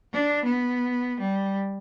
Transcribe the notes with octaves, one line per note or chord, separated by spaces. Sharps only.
D4
B3
G3